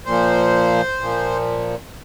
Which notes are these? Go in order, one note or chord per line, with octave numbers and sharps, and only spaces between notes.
A#2 F3 C5
A#2 F3